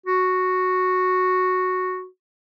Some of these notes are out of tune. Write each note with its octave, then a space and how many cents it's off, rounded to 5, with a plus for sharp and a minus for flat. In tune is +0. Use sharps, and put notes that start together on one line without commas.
F#4 -5